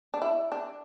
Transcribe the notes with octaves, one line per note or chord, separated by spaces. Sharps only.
D4
E4
D4